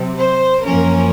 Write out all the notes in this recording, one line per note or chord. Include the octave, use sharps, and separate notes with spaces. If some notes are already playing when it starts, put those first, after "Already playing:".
Already playing: C3 F#3 C4
C5
F#2 F3 A#3 C#4 A#4